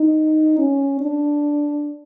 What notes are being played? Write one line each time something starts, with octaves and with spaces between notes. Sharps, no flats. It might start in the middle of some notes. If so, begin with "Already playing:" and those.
Already playing: D#4
C#4
D4